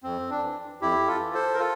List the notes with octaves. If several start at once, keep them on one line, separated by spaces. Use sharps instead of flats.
F2 C4
D4
E3
F2 E4 G4
F4 A4
E3
A4 C5
A#4
F4 A4